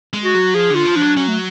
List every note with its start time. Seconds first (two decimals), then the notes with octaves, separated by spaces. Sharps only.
0.13 G#3
0.23 F#4
0.34 F#3
0.54 F3 G#4
0.70 D3 F4
0.85 F3
0.96 D4
1.01 F#3
1.16 F#3 C#4
1.28 A3